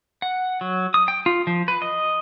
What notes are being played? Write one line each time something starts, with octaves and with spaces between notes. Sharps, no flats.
F#5
F#3
D#6
G5
F4
F3
B4
D#5